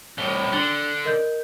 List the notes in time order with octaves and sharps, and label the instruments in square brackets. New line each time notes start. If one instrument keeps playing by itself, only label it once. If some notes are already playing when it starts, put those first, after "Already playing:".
[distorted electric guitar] C2 A2 [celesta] G7
[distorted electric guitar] D3 [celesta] D4 A6 G7
[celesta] A#4 D#5 G6